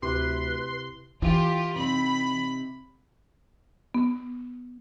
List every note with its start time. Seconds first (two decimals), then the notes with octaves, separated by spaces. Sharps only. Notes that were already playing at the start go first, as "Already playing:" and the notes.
0.02 D2 C3 E4 G4 B4 C6
1.22 E3 F4 G4
1.76 C3 D#4 B5
3.94 B3